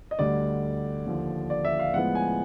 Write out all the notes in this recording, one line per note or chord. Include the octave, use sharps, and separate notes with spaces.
D#5
D2 D3 G3 D5
D#2 D3 F3
D5
E5
F5
A2 F3 G#3 B3 F#5
G#5